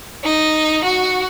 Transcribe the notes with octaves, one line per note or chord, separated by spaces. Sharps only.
D#4
F#4